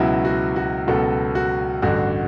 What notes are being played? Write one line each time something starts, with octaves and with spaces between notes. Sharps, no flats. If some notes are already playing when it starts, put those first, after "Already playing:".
Already playing: C#2 B2 F#3 E4
F#4
F#4
C#2 B2 F#3 A4
F#4
A1 G2 D3 F#4